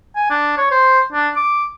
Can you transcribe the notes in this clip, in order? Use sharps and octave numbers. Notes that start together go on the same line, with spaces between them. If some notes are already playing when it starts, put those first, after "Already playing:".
G#5
D4
C#5
C5
D4
D6